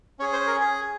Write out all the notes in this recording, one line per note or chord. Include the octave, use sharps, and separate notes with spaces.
C#4 G#4 C#5
C5
A#4
G#4